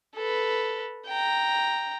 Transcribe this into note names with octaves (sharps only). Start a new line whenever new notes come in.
A4 B4
G5 A#5